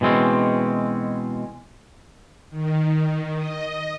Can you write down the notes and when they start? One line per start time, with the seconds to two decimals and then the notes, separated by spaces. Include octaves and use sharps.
0.01 B2 E3 G#3 C4 C#4
2.50 D#3
3.37 D#5